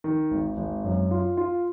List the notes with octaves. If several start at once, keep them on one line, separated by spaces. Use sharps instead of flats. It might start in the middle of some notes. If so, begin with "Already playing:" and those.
D#3
G#1
G#1
F#2
F4
F4